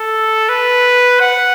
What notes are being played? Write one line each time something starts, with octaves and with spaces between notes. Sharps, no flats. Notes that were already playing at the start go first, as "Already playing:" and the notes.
Already playing: A4
B4
F#5